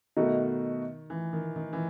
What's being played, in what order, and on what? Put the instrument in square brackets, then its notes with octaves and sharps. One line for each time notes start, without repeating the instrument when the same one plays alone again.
[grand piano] B2 A3 D#4 F#4 [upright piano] D#3
[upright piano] E3
D#3
D#3
E3